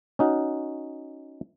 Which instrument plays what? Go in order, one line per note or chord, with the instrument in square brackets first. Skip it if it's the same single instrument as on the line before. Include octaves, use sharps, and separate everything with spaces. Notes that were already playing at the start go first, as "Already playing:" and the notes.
[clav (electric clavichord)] C#4 D#4 F#4